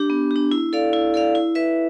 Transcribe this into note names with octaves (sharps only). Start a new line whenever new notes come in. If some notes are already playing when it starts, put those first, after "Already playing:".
Already playing: D4 G4
B3
G4
D4
E4
A4 D5 F5
E4
A4 D5 F5
E4
B4 E5